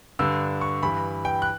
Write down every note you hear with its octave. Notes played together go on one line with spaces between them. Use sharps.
G2 D3 E6
C#6
G2 E3 B5
G5
F#6